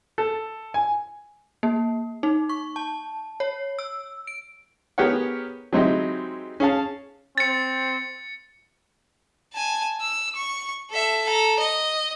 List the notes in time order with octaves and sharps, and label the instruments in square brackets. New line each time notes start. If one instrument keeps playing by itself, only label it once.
[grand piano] A4
G#5
[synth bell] A#3
D#4
C#6
A5
C#5
E6
D7
[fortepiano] B3 G4 G#4 A#4 C#5 F#5
F#3 G#3 C4 D#4 E4 G4
C#4 G#4 F5 A5
[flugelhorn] C4 [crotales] A6 C#7
[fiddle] G#5 A5
E6
C#6
A4 E5
A4 A#5
D#5